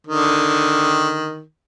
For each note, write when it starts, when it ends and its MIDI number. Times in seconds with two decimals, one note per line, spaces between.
0.07 1.42 50
0.07 1.42 51